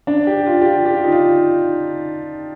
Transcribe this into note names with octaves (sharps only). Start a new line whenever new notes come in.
D4
G4
F4
G4
F4
G4
F4
D#4
F4